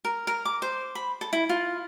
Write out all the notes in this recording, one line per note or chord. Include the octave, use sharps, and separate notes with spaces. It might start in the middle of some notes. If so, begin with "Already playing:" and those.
A#4
A#4
D6
C5
B5
A4
E4
F4